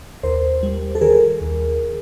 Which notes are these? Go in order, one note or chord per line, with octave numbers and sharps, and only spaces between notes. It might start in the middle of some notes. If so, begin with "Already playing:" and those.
D#2 A#4 C5
G3
A4
D#3 G#4 A#4
D#2